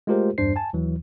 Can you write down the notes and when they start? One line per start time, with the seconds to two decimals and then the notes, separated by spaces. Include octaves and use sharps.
0.07 G#3 A3 F4 G4 A#4 C5
0.38 E2 G2 D4 C5 C7
0.56 G#5 A5
0.73 D#2 E3 F#3